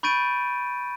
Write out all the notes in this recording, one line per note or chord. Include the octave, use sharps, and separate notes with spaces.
B5 C#6 G6 A6 D7 D#7